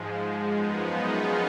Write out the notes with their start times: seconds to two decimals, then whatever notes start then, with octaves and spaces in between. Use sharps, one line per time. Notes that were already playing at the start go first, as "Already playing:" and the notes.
Already playing: G#2 F3 G#3
0.46 F#2 F3 G#3 B3 D#4
1.05 C#4 F4